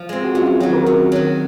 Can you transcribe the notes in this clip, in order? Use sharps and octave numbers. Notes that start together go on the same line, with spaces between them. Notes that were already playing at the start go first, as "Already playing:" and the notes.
Already playing: F3
G#3 C4
F#4
F#2 F4
F4
D#3 F#3 F#4
F#4 A#4
F#2
D#3 F#3